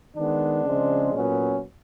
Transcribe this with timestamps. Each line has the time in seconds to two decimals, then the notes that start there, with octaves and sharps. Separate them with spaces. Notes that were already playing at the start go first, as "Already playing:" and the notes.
0.17 D#3 G#3 B3 D4
0.65 C#3 F3 G#3 C4
1.14 A#2 F#3 B3 C#4